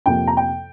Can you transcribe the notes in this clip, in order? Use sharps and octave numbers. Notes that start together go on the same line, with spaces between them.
F2 C3 F3 A#3 G5
A#5
G5